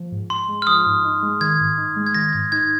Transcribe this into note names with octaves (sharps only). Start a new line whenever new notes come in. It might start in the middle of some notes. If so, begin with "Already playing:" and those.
Already playing: F3
G#2
G#2 C6
G#3
F6
F3 D#6
G#2
D#4
G#3
D#3 G#6
G#2
D#4
G#3
G#6
D#3 A#6
G#2 G#6
D#4 G#6